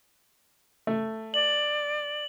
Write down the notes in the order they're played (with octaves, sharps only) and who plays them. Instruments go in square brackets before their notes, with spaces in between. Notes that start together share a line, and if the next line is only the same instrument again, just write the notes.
[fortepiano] A3
[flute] D5 [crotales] F#7